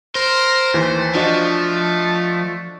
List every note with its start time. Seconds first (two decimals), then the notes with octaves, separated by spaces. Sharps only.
0.15 A#4 C5
0.74 D#2 E3 A3
1.15 F3 D4 F#4 D#5